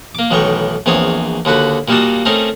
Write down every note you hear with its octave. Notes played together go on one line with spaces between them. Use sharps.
A#3 D6
B1 A2 D#3 E3 G5 C#6
A#1 E2 C4 C#5 G#5 D#6
D#2 D3 F#4 B4
A#2 G3 A#3 D#4 F#4 A5
A3 C4 C#4 D#4 A#4